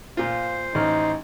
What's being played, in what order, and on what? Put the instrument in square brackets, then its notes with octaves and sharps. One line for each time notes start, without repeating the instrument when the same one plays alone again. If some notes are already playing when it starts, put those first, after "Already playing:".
[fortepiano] A#2 F4 [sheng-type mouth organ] C5
[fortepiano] A1 F6 [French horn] D#4